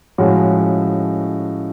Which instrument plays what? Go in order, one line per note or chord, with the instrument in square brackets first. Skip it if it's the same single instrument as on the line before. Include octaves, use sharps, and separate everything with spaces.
[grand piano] A2 F3 G#3 C#4 F#4